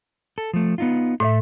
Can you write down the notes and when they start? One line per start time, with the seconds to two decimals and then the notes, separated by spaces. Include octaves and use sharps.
0.38 A4
0.54 F3 A3
0.78 B3 D#4 F4
1.20 A2 A3 C#5 E5